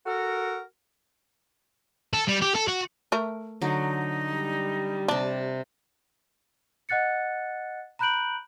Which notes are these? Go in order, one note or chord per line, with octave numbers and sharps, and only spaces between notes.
F#4 A4 A#4
A4
G3
G4
A4
F#4
A3 A#4
D3 F#3 D#4
G3
C3 D4 A5
D#5 F#5 F#6 A6 C#7
A#5 B5 F#6 G6 D7 F#7